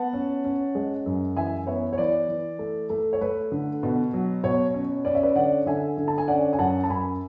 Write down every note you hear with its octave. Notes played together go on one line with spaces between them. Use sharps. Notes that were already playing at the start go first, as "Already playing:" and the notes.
Already playing: B3 F#5 A5
C#4
C#4
G#3
F#2
E3 E5 G#5
B3 C#5 E5
C#5
E3 B4 D5
E3
A3
A3
C#5
A3 B4
D3
B2
F#3
B2 C#5
C#4
C#4 D5
E5
B4 D5
D3 D5 F#5
D3 E5 G#5
D3
A5
G#5
C#4 D5 F#5
G#5
F#2 F#5 A5
A5
F#2 G#5 B5